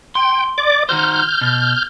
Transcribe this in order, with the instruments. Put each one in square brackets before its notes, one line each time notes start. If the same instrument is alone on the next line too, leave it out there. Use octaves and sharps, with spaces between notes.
[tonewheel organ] G5 [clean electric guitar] C6
[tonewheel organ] D5 D6
[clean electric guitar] D#3 F#4 C5 [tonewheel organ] F6 G6
[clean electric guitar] B2